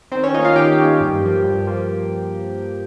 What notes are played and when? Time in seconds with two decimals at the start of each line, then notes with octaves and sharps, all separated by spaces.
0.12 D#3 C4 C5
0.24 C#4 C#5
0.34 A#3 C#4 D#4 F4 D#5
0.45 F4 F5
0.56 D#3 G4 G5
0.79 A#3 C#4 F4
1.01 G2
1.23 F3 A#3
1.44 G2
1.67 F3 A#3